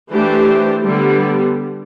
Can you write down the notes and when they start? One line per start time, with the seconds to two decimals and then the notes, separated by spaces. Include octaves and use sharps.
0.11 E3 A3 D4 G4 C5
0.83 D3 G3 B3